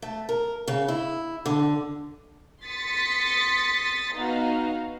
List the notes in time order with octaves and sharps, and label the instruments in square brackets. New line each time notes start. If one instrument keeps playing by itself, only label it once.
[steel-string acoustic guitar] A3
A#4
C#3
E4
D3
[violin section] C6 D#6 A6 B6 C#7
B3 D#4 F#4 F5